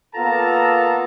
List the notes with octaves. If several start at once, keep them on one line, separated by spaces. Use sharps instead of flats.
A#3 B3 F4 A4 A5 A#5